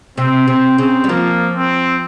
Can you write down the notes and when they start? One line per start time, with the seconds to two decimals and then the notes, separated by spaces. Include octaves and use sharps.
0.18 C3 C4
0.48 C3 C4
0.78 C#3 C4
1.04 G3
1.09 F3 A#3
1.55 C4